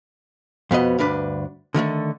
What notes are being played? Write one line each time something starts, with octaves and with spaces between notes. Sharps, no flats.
F2 B2 B3 D#5
D2 G2 D4 B4
D3 D#3 F#3 A3